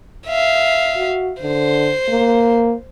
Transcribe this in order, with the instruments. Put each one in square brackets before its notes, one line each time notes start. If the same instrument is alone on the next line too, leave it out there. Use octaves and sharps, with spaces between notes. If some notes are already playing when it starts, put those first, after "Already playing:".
[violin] E5 F5
[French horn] F#4
[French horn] D3 [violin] C5
[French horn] A#3